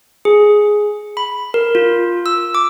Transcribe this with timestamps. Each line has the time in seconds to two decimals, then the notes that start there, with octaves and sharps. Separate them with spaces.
0.25 G#4
1.17 B5
1.54 A#4
1.75 F4
2.26 E6
2.55 D6